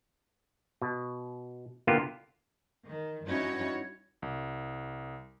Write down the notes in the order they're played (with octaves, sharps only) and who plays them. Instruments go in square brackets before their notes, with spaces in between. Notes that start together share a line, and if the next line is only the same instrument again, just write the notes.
[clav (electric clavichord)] B2
D3 A#3 B3 E4 F4 G4
[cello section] D#3
G2 C#4 D#4 E4 F#4 C#5
[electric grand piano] C2